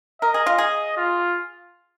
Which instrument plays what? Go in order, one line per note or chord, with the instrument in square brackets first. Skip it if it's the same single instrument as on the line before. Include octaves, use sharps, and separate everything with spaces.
[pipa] A#4 [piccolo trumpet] D#5
[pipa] G#4
F4
G#4
[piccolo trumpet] F4